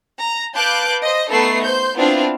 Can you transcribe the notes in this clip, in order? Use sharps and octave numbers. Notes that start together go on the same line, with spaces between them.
A#5
B4 F5 A5 D6 F#6 G6
C5 D#5
A3 B3 D#4 A4 B4 C7
C5 C6 G6
B3 C4 D4 E4 F4 F5